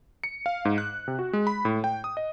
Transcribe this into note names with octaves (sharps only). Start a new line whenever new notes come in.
C#7
F5
G#2
F#6
C3
F#4
G#3
B5
A2
G5
D#6
D#5